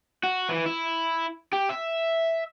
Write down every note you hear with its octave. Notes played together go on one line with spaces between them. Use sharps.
F#4
E3
E4
G4
E5